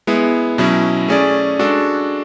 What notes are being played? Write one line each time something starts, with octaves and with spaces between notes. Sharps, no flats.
G#3 B3 E4
B2 F#3 C#4 E4
A3 C#4 G#4 D5
G#3 D4 F#4 A4